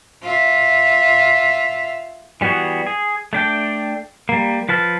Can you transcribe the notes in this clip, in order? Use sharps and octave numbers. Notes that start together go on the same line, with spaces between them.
F4 E5
E3 G3 B3 F#4 G#4
G#4
A3 D4 G5
G3 A#3
F3 B4 A5 F6